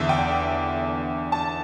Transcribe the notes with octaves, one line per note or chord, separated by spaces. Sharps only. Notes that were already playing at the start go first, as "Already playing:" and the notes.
Already playing: E2 D3 E5
G5
A5